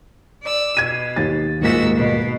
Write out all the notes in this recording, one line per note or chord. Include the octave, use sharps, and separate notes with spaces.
D5 E6
B2 G#6 D#7
D#2 A6
D#1 G#2 A#3 F#4 E6 B6
B2